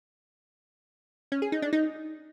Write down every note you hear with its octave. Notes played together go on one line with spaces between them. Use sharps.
C#4
G#4
D#4
D4
D#4